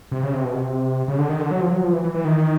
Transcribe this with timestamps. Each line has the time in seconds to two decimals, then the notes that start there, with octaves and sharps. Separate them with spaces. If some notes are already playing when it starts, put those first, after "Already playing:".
0.11 C3
0.23 C#3
0.34 C3
0.44 B2
0.55 C3
1.08 C#3
1.18 D3
1.29 D#3
1.40 D3
1.51 F#3
1.61 F3
1.71 F#3
1.83 F3
1.93 E3
2.03 E3
2.14 E3
2.25 D#3